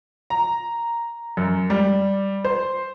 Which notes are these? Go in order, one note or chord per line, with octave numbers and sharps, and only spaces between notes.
A#5
F#2
G3
C5